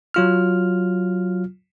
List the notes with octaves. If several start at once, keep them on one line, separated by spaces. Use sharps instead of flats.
F#3 F4 F6